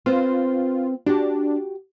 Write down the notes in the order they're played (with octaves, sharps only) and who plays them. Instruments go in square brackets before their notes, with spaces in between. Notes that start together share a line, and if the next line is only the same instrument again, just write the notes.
[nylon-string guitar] C4 B4 C5 [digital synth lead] F4
[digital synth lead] D4 [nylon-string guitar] F#4 G4